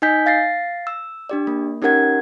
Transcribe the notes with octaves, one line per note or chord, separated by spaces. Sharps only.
D#4 D#5 G#5 G6 B6
F5 A6 A#6 C7
E6
D4 G4 D5
A#3
C#4 D#4 G4 A#4 F#5 G#6